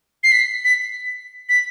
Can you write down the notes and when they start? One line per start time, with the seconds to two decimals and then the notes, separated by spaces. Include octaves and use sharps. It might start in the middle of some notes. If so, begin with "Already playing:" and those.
0.23 C7
0.32 B6
0.64 B6
1.49 B6